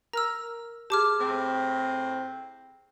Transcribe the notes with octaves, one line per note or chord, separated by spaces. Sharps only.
A#4 A#5 E6 F6
G4 G#4 A5 D6 F6
A2 C4